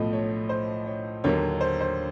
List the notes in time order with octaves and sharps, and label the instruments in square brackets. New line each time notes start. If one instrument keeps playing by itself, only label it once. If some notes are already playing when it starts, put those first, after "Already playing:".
Already playing: [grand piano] B1 A2 F3 A3 D#5
C#5
C5
C#5
D#2 D3 F#3 A#3 C#5
C5
C5